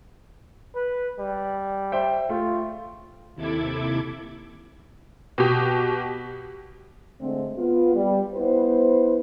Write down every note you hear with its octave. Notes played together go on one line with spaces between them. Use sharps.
B4
G3
C5 E5 G5
A3 F4
D#2 C3 E4 A4 D6 G#6
B2 G4
D3 G#3 A3 C4
B3 F4
G3
B3 E4 B4 C5